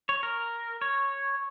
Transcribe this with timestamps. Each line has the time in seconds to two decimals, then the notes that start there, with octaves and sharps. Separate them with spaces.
0.09 C#5
0.23 A#4
0.81 C#5